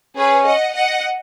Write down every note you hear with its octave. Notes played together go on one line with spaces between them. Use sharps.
C#4 G#4 B4
D#5 F#5
D#5 F#5